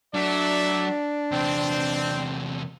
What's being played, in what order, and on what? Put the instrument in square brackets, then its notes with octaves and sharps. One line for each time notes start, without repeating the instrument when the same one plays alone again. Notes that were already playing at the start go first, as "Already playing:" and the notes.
[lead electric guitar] F#3 [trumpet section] A3 D5 E5 [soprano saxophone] D4
[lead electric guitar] E2 C3 [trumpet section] C4